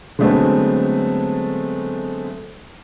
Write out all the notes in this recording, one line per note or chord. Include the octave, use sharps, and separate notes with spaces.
D3 F#3 G#3 A3 B3 C4